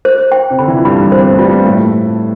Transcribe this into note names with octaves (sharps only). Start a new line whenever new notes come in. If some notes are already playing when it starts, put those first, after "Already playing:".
C5
G5
C3
D3 B5
E3
F3
G2 G3 B5
C5
C4
B3
A3
G2 G3 F4
A2 A3 E5